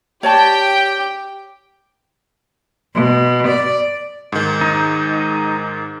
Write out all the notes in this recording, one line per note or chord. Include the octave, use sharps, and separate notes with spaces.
G4 C#5 D5 G5 A5
B2
D5
G#2 D#3
D#4